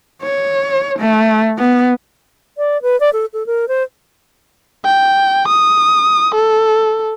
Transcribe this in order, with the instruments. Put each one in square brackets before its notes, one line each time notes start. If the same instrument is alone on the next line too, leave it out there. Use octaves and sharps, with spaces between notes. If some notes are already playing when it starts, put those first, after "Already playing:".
[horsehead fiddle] C#5
A3
B3
[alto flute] D5
B4
D5
A4
A4
A#4
C5
[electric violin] G5
D#6
A4